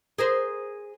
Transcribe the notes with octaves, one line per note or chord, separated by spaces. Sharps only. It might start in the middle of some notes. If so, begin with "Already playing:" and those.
G#4 A#4 C5